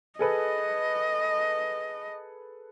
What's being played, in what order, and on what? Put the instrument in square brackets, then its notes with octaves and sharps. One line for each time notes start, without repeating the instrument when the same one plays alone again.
[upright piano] G#4 A4 B4 [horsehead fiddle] D#5